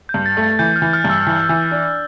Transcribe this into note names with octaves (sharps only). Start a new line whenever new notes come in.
G6
G2
A6
A3
A6
E3 G6
F6
E3
F6
G2
E6
E3
E3
D4